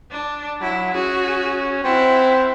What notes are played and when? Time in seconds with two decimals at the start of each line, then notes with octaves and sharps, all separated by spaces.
0.11 D4
0.61 F#3 E4
0.94 C#4 F#4 G#4
1.84 C4 E4 F#5